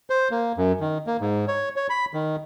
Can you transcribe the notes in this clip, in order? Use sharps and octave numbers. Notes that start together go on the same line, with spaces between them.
C5
A#3
F#2
D#3
A#3
G#2
C#5
C#5
B5
D#3